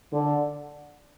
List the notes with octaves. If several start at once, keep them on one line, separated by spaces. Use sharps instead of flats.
D3